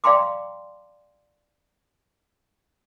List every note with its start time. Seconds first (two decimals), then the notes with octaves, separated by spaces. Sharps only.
0.04 D5 F5 G5 A#5 C6 D6